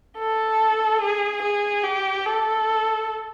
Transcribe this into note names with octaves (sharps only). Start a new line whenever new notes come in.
A4
G#4
G#4
G4
A4